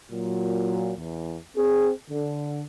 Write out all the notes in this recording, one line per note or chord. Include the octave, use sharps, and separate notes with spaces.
A#2 F#3
E2
C4 G#4
D3